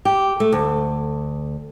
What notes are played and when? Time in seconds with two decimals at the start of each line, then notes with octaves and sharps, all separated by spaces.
0.05 G4
0.40 A3
0.52 D2